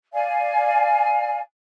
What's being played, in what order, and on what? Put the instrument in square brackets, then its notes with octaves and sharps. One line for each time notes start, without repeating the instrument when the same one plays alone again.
[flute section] D5 F5 G#5